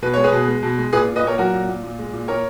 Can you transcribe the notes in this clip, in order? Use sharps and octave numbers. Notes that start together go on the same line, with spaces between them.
B2 B4
G#3 C#5
G#4 B4
B2
G#3
B2
G#3
A#2 G#4 B4
A#2
B4 D#5
A#2 A#4 C#5
F#3 F#4 A#4
A#2
A#2
A#2
G#3
A#2
A#2 A#4 C#5